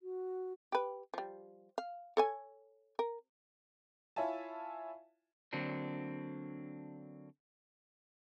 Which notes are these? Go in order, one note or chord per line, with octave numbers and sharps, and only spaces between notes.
F#4
G4 B4
F3 G3
F5
A4 C#5 G#5
A#4
E4 F4 C#5 E5 G#5 A5
D3 F#3 A#3 C4 D4